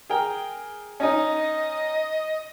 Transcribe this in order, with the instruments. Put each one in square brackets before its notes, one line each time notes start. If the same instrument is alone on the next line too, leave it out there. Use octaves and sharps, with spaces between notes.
[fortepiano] G#4 A#4 G5
[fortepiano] C#4 D#4 [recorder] D#5